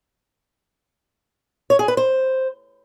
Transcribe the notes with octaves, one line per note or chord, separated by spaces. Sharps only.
C#5
G#4
B4
C5